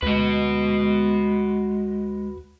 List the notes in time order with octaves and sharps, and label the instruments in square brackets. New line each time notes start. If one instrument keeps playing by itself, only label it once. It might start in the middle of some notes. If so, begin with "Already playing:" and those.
[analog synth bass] D2 [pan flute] G#3 [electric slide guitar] F#4 B4